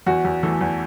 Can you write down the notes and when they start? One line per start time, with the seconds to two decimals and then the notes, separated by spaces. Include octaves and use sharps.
0.06 E2 F#4
0.25 E2
0.43 E3 A3 A4
0.61 E2